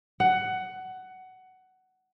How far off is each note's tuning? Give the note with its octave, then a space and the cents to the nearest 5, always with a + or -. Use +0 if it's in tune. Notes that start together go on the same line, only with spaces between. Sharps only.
F#5 +15